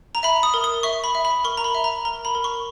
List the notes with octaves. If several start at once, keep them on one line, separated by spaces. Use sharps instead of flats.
A#5
E5 B5
D#6
A#4
D#6
E5 C#6
B5
E5
B5
A#4 C#6
A#5
B5
E5
A#5
A#4 A#5
B5
A#4
C#6